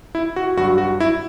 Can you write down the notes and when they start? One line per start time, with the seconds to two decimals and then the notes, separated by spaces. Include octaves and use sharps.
0.15 E4
0.36 F#4
0.57 G2 F#3 F#4
0.78 F#4
1.00 E4